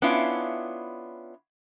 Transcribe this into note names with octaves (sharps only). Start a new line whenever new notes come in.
B3 C#4 D4 E4 F4